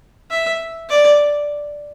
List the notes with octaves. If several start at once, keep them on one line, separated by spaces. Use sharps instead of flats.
E5
D5